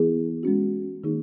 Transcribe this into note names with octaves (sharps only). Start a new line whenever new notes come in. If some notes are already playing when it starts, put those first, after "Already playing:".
Already playing: E3 B3 E4 G#4
G#3 C#4 F#4
D#3 A#3 D#4 G#4